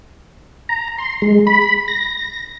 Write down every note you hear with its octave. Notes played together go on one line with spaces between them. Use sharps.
A#5
C6
G#3
B5
A#6